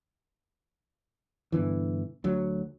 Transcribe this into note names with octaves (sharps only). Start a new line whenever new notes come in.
G2 B2 D3 E3
D2 F#3